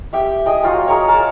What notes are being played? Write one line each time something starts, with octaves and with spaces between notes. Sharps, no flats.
G4 E5 G5
G#4 D#5 G5
F#3 F4 G5
G#4 A#4 C#5
A#4 A5